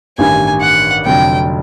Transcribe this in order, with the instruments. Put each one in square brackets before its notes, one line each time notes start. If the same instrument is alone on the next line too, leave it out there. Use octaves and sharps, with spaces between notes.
[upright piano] A1 G2 D#3 G3 [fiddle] G#5
[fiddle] F#5
[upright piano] F1 F2 D3 F#3 [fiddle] G5